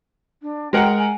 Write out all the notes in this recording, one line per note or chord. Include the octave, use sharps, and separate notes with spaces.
D4
G#3 A#4 F#5 G5
G#5